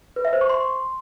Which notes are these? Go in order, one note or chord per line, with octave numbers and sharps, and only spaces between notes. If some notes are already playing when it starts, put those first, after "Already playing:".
B4
E5
C5
C#6
C6